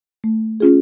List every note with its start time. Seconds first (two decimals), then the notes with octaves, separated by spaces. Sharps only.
0.24 A3
0.60 C#4 F4 G#4